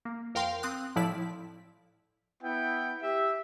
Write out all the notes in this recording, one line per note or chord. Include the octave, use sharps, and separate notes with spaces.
A#3
F2 A#4 F5 G5 C6
C4 D#6 F#6
A2 F3 E4 D5 B6
B3 E4 G5
G4 E5